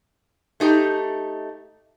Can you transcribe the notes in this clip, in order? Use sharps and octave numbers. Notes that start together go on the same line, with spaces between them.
A3 D#4 G4